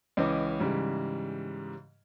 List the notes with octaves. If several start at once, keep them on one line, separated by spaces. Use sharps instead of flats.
C#2 E3 C#4 D#5 D6
G#2 C#3 E3 G3